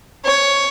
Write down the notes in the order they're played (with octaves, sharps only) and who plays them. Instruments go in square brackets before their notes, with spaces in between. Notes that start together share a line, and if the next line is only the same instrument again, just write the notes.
[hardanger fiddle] C#5